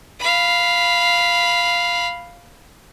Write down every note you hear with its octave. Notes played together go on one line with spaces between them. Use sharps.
F5 B5